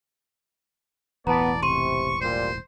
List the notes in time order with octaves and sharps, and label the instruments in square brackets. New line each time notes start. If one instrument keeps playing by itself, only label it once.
[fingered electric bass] E1 A1 E3 [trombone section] B3 [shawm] D5 [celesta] A5 A#5
[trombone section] C3 [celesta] C6 D#7 [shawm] C#6
[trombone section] A#2 G3 [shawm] C5